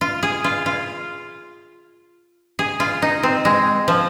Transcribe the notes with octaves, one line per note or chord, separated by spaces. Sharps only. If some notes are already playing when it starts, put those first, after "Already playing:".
F4
G#4
F4
F4
G#4
F4
D#4
C4
G#3
F3